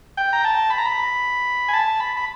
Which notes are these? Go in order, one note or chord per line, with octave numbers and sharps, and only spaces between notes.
G5
A#5
A5
B5
A#5
B5
G#5
A5
B5
B5